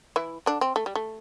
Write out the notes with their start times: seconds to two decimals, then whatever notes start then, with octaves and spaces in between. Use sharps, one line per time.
0.16 E3 E4
0.46 D3 D4
0.61 C4
0.76 A3
0.86 G3
0.95 A3